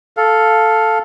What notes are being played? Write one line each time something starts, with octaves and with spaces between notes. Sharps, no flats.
A4 F5